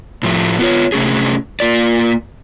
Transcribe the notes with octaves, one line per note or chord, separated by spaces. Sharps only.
A2 F3 A3
B3 F4 C#5
C3 A3 C#4 G#4
A#3 F4 D5